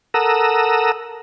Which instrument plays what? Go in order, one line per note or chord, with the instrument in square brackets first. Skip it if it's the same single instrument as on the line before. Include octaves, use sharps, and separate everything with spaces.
[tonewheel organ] A4 A#4 F#5 A#5 D#6 E6